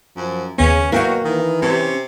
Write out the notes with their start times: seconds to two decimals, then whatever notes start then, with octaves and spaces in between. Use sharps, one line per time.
0.17 F#2 F3
0.58 D#2 C#3 B3 C#4
0.92 B2 F#3 A#3 E4 F#4 F5 G5 C#6
1.25 D#3 E3
1.62 C3 C#4